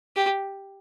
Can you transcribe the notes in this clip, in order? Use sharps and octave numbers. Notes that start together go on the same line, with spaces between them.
G4